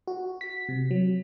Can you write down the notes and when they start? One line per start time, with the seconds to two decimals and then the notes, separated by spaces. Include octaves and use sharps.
0.08 F#4
0.41 B6
0.69 C3
0.91 F#3